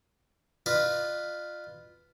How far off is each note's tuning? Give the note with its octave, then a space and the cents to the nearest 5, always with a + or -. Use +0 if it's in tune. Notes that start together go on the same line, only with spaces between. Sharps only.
F4 +0 B4 +0 D#5 -45